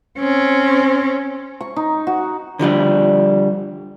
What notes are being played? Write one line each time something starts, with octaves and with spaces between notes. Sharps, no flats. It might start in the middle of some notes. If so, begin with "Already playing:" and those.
C4 C#4
C#6
D#4
F#4
D3 F3 G3 D4